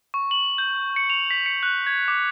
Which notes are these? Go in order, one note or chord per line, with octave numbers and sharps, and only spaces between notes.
C#6
F#7
G6
C#7
F7
B6
C#7
F#6
G#6
D6